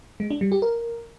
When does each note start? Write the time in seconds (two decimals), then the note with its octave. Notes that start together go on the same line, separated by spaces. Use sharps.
0.20 G#3
0.31 D4
0.41 G3
0.52 G4
0.62 A#4